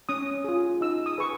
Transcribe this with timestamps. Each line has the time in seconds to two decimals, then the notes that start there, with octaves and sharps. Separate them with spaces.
0.09 C#4 D#6
0.44 F4 G#4
0.81 D#4 E6
1.06 D#6
1.18 G#4 B4 C#6